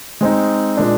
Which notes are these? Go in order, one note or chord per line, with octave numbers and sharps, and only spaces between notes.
G#3 C4 D#4
A#2 G#3 D4